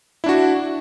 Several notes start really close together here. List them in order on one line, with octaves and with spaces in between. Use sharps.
E4 D4 F#4